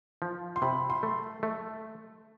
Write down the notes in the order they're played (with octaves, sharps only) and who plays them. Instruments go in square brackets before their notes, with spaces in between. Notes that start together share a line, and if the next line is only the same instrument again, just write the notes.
[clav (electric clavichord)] F3
[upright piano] C6
[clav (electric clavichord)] C3 [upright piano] B5
[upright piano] C6
[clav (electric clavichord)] A3
A3